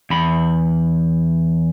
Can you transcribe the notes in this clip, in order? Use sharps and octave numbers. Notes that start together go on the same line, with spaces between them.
E2 B5